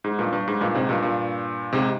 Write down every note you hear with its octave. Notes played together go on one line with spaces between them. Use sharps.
G#2
G2 A#2
G2
G#2
G2 A#2
G#2 C3
G2 A#2
G2 A#2
G#2 C3